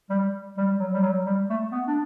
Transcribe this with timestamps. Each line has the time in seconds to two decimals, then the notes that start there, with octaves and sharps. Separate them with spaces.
0.10 G3
0.57 G3
0.79 F#3
0.93 G3
1.02 F#3
1.26 G3
1.50 A3
1.72 B3
1.87 D4